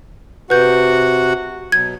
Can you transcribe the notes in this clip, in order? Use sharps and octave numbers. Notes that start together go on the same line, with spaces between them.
C3 F#4 B4 F#5 G6
B2 F#3 G#6